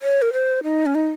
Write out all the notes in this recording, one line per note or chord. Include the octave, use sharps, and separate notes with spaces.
C#5
A#4
C5
D#4
C#4
D#4